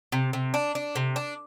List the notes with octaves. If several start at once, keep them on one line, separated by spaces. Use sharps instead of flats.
C3
C3
D4
D4
C3
D4